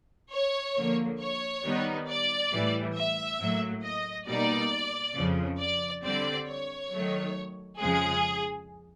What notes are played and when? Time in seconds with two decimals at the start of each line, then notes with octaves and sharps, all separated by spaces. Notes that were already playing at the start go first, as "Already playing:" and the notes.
0.32 C#5
0.76 D3 F3 A#3
1.20 C#5
1.65 D#3 G3 B3 D#4
2.09 D5
2.53 A2 E3 G3
2.96 E5
3.40 A2 F#3 A#3
3.83 D#5
4.28 B2 G3 A#3 D#4 D5
5.16 F2 C#3 F3
5.60 D5
6.03 D3 G3 C4 D5
6.48 C#5
6.92 D#3 F#3 A3
7.79 F2 C#3 F3 G#3 G#4